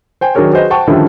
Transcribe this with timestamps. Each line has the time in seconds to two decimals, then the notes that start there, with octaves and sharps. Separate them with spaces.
0.21 C5 G5 G#5
0.35 D#3 F#3 D4 G#4 A#4 C#5
0.52 F#4 G#4 B4 C5 D#5
0.70 C5 F#5 G5 A5 C#6
0.87 D3 D#3 F3 G3 C#4 E4